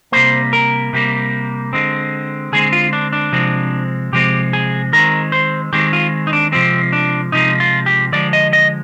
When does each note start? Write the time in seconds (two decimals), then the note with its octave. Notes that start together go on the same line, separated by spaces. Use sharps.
0.12 C3 G3 A#3 C5
0.53 A#4
0.93 C3 G3 A#3
1.73 D3 G#3 C4
2.52 D3 G#3 C4 G#4
2.73 F4
2.93 D4
3.13 D4
3.32 C3 F3 G#3 C4
4.12 C3 F3 G#3 C4 G4
4.53 G#4
4.93 D#3 G#3 C4 A#4
5.32 C5
5.73 D#3 G#3 C4 G4
5.93 F4
6.27 D#4
6.33 D4
6.52 C3 F3 G#3 C4
6.93 D4
7.32 C3 F3 G#3 D#4
7.60 F4
7.86 G4
8.12 D3 F3 G#3 D5
8.33 D#5
8.53 D#5